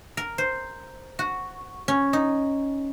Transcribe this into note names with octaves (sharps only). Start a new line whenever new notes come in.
A#4
C5
F#4
C#4
D#4